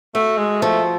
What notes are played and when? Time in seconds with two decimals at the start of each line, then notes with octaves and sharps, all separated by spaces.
0.15 A3 F#4
0.38 G#3
0.62 F3 A3